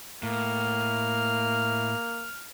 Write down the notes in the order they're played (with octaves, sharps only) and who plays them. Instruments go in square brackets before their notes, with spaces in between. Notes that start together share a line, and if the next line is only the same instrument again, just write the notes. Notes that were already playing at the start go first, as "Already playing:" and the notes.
[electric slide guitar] A2 [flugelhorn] A#3 [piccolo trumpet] F6